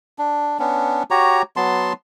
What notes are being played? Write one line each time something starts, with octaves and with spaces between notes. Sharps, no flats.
D4
B3 C#4 D4
F#4 G4 C#5 A#5
F#3 B3 A5 C6